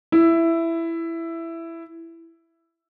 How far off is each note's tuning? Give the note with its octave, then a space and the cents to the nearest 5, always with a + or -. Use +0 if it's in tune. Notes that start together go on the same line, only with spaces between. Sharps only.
E4 +10 E5 +5